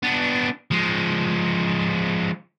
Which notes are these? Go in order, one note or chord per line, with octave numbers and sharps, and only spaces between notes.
B3 D4
F3 G#3